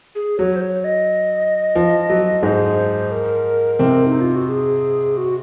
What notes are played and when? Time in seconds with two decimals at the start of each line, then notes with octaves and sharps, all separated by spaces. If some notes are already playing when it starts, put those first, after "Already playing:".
0.15 G#4
0.39 F#3 C#5
0.56 C5
0.62 C#5
0.84 D#5
1.75 F3
2.10 F#3
2.43 G#2 G#3 C5
3.12 A#4
3.79 C3 C4
4.07 D#4
4.21 F4
4.35 F#4
4.49 G#4
5.17 F#4